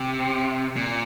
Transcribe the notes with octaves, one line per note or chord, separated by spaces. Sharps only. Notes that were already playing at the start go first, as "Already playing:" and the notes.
Already playing: C3
A#2